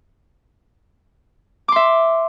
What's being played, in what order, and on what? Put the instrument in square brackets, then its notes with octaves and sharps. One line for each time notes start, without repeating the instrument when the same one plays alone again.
[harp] D6
C6
E5